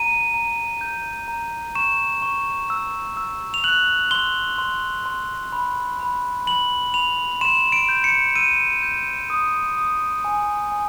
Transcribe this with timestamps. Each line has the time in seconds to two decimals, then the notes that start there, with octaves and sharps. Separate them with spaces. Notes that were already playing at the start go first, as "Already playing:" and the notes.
Already playing: A#5 D#7
0.34 A#5
0.81 G6
1.28 A#5
1.75 C#6 E7
2.22 C#6
2.70 E6
3.17 E6
3.54 F7
3.64 F#6 F#7
4.11 C6 G7
4.58 C6
5.06 C6
5.52 B5
5.99 B5
6.47 B5 F#7
6.94 B5 F7
7.41 C6 E7
7.72 D7
7.89 G6
8.04 C#7
8.36 E6 D#7
8.83 G6
9.30 D#6
9.77 D#6
10.25 G#5
10.72 G#5